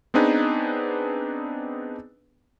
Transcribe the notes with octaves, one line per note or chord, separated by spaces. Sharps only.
B3 C4 D4 D#4 G#4 B4